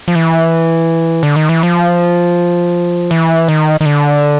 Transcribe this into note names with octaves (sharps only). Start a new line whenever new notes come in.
F3
E3
D3
D#3
E3
F3
E3
D#3
D#3
D3